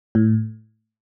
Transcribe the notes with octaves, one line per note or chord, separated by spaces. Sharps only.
A2